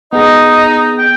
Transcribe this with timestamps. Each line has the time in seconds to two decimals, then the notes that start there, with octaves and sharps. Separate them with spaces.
0.13 B3 D#4 G#4 D#5
0.98 G5